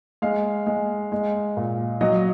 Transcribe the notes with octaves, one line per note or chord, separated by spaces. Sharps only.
G#3 F5
G#3
G#3
A#2
F#3 D#5